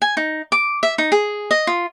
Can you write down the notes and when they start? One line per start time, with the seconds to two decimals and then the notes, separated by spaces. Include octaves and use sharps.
0.02 G#5
0.17 D#4
0.52 D6
0.83 E5
0.98 D#4
1.12 G#4
1.51 D#5
1.67 F4